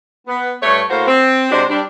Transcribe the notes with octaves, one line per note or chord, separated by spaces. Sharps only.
B3
G2 A3 C#5
A2 A#3 F#4 C5
C4
C3 G#3 D4 F#4 C5
G3 D4